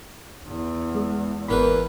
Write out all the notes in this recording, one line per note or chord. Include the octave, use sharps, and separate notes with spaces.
E2
G#3
G#1 E2 A#3 B4 B5